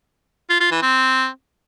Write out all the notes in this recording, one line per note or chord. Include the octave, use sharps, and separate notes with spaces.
F4
F4
E3
C4